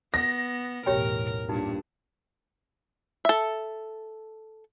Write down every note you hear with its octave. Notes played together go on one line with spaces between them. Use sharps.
B3 A#6
B1 E2 A2 G4 A#4 C#5 G5
G2 A#2 D#4
A4 E5